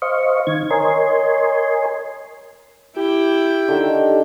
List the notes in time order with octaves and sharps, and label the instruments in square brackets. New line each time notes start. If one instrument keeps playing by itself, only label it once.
[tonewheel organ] C5 D#5 F5 C#6
D#3 G#6
A#4 C#5 D#5 G#5 C6
[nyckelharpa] E4 G5 [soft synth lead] G4
[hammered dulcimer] D3 D#3